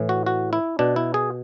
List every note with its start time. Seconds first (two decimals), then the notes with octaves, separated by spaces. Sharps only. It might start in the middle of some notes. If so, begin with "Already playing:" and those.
Already playing: A2 E3
0.09 F#4
0.26 F#4
0.53 E4
0.79 B2 D4
0.96 E4
1.14 G#4